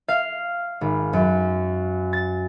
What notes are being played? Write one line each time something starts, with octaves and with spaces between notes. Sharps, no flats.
F5
G#1
F#2
A6